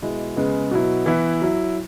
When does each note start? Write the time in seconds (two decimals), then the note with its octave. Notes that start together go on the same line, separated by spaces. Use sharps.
0.02 B2 G#3 E4
0.36 C#3 G#3 B3
0.71 B2 F#3 E4
1.06 E3 B3 E4
1.41 F#3 E4